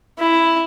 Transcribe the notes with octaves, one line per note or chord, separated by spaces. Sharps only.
E4